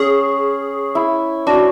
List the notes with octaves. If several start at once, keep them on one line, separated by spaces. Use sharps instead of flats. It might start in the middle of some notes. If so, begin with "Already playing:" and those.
Already playing: C#4 G#4
E4
D4 F#4
C#4